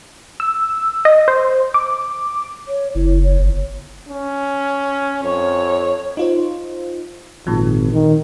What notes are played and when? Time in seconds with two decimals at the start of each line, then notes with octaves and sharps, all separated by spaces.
0.40 E6
1.05 D#5
1.28 C5
1.74 D6
2.68 C#5
2.95 F#1 E4
3.24 C#5
3.39 G1
4.09 C#4
5.23 F2 C#5
6.17 D#4 F4 C5
7.47 G#1 A#2 F3
7.93 D#3